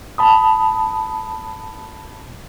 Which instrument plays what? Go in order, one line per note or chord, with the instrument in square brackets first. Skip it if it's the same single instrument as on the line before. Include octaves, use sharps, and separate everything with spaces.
[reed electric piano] A5 B5 D#6